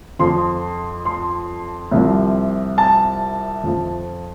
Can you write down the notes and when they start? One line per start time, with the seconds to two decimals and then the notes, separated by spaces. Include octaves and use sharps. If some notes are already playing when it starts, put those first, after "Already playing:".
0.19 F2 F3 C6
1.05 C6
1.91 C2 C3 F3
2.78 A5
3.64 F2 F3